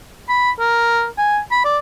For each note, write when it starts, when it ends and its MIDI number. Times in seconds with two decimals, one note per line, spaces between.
0.29 0.51 83
0.60 1.06 70
1.18 1.40 80
1.51 1.61 83
1.65 1.78 74